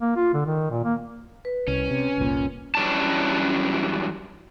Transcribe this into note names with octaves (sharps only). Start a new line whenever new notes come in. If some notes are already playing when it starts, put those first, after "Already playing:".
A#3
F4
D3
D#3
A#2
A#3
B4
C2 C#4
C3
F1 C2 A#2
F#2 E3 G3 C#4 D4 A5